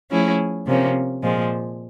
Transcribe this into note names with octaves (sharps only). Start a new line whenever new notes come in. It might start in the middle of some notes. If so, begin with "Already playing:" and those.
F3 A3 C#4 E4 G#4
C3 F3 A#3 C#4
A#2 F3 G#3